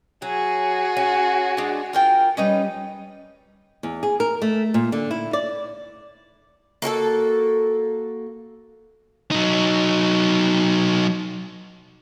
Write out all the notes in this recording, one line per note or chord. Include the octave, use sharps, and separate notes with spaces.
F#3 F#4 G#4
C#4
G#3 D4
F4 A#4 G5
G3 C#4 D#4 B4
E2
G#4
A#4
A3
A#2
D3
E4
D5
A#3 F#4 G#4 A4
F#3 D#4